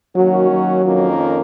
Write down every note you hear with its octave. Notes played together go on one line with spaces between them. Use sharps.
D#3 F#3 A#3 C#4 F#4
F#3
F2 D#3 A#3 C#4 F4